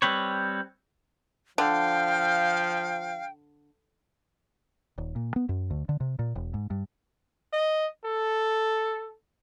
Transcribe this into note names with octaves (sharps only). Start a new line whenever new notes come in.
G3 C4 B4 C#5
D3 F3 F5 G5
D#1
A#2
B3
F#2
D2
D3
C3
A#2
E1
G#2
G2
D#5
A4